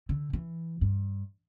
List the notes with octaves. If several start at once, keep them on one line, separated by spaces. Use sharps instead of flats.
D3
E3
G2